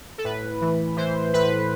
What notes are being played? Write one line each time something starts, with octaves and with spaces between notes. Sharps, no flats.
A4
A2 B4
E3
E3 C5
A2 B4